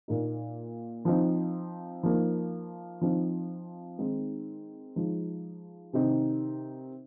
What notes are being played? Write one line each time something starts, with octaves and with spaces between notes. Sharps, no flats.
A#2 A#3 D#4
F3 C4 D#4
F3 A#3 D#4
F3 C4 D#4
D#3 G#3 C4 D#4
F3 G#3 D#4
C3 D#3 C4 D#4